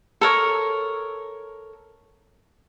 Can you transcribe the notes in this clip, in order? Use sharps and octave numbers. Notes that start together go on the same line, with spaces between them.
A4 A#4 C#5